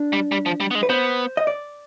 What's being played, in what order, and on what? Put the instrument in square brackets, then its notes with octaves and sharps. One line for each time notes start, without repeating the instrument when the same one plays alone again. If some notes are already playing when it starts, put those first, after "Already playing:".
Already playing: [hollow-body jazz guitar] D4
[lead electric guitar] G3
G3
F3
G3
B3
G#3
[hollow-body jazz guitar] B4
[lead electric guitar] B3 [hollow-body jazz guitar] C5
[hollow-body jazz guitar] D#5
D5